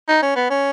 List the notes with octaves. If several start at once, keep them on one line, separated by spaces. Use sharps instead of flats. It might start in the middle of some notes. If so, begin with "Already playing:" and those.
D#4
C#4
B3
C#4